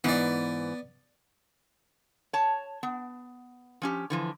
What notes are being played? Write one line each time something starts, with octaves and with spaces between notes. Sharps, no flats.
G#2 E3 B3 D5
C#5 A5
B3
F3 C#4 G4
D3 E3 F3